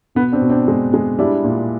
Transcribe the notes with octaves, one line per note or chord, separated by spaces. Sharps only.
B2 B3
C4 D4
B2
C4 D4
G#3
G#3
G3 D4 E4
A#2